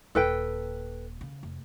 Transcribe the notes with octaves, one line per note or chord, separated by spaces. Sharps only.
D#1 A4 B4 G5
C#3
F1